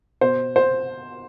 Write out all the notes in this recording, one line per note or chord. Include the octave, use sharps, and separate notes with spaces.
B2 C5
C5